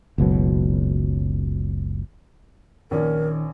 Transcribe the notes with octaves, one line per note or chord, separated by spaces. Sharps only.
F#1 C#2 B2 F#3
A#1 D#3 C#4 A#4 D5